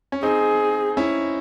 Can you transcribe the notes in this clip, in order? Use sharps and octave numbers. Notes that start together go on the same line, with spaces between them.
C#4
C4 D#4 G#4
C#4 E4